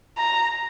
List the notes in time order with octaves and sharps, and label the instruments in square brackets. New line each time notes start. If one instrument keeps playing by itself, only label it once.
[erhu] A#5